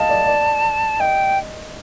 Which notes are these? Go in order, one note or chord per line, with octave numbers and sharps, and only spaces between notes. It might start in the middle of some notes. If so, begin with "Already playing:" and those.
Already playing: D#5 F5 A5
D5
D5
D#5 G5